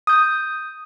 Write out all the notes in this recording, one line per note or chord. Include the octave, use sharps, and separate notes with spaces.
D#6 G6